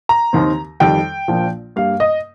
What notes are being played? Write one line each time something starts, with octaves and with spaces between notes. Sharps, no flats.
A#5
D#2 D#3 C4
F2 D#3 G3 G5
A#1 A#2 F3 A#3
G2 G3 A#3 F5
D#5